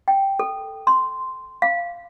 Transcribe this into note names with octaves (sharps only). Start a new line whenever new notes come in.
G5
A4
C6
F5